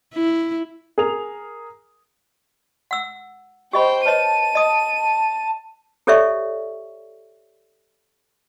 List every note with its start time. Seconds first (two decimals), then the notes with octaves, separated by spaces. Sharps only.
0.14 E4
0.98 G#4 A#4 F7
2.91 F#5 E6
3.73 G4 C5 D#5 G5 B5
4.06 B4 C#5 D#5 A5 D#7
4.55 D#5 D#6
6.07 G4 A4 C#5 D5 E5 C#6